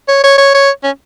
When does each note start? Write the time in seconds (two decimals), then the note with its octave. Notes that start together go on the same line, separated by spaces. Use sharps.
0.08 C#5
0.24 C#5
0.38 C#5
0.55 C#5
0.84 C#4